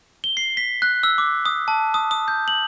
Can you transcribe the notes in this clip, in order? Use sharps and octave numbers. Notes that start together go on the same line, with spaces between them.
G7
C7
B6
F#6
E6
D6
D#6
A5
D#6
D#6
G6
F#7